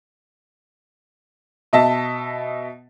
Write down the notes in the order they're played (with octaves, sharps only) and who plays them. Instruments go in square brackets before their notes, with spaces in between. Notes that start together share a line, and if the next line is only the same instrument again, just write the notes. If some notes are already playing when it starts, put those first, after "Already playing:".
[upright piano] B2 D#5 E5 A5